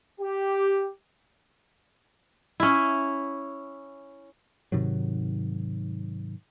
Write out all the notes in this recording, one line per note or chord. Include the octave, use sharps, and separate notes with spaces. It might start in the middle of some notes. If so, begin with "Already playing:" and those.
G4
C#4 E4
G#2 C3 D#3 F#3